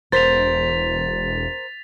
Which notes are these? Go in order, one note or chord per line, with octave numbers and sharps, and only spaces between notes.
E1 A#4 C5 A6 B6 F7